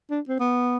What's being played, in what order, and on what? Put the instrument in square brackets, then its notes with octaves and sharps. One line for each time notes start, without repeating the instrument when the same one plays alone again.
[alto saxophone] D4
C4
B3